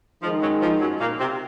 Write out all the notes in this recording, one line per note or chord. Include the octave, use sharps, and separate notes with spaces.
D#3 F3 G#3 D#4
F#2 F#3
F3
F#2 F#3
A#2 A#3
C3 C4